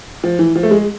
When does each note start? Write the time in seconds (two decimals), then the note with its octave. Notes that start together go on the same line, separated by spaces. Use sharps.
0.24 F3
0.39 E3
0.55 F3
0.63 A3
0.71 G#3